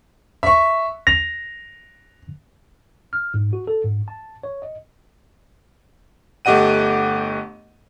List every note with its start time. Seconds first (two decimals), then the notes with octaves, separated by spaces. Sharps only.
0.43 E5 C#6
1.07 A#6 F7
3.13 F6
3.34 G#2
3.53 F#4
3.67 A4
3.84 G#2
4.08 A5
4.43 C#5
4.62 D#5
6.45 G1 A3 G4 D#5 F#5 D#7